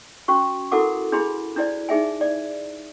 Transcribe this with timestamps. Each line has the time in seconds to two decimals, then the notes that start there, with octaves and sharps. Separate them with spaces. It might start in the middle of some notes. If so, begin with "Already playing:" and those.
0.28 C#4 F#4 C#6
0.72 E4 F#4 A4 A#4 F#5 D6
1.12 D4 E4 G#4 B5 C6
1.56 D4 E4 C5 D5
1.89 D#4 G#4 E5 G#5
2.21 D5